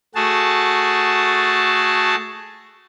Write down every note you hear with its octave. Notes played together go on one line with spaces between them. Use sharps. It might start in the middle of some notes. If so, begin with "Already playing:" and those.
A3 F#4 G#4 A5